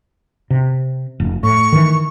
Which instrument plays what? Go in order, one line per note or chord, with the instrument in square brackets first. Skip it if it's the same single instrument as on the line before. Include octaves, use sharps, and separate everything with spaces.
[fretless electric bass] C3
F1
[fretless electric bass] A2 [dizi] C#6
[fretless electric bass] D#3 E3